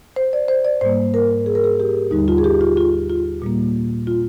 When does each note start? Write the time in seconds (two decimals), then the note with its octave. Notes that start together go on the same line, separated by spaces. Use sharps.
0.16 C5
0.33 D5
0.48 C5
0.65 D5
0.81 G#2 G3 A#3 C5
1.14 A#4
1.46 G#4
1.55 A#4
1.64 G#4
1.80 G4
2.11 D#2 D3 G3 D#4
2.28 F4
2.38 G#4
2.44 G4
2.61 F4
2.77 F4
3.09 F4
3.42 A#2 G3 A#3
4.07 F4